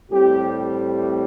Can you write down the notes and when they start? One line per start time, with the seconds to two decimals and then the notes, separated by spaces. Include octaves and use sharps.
0.10 A2 G3 C4 G4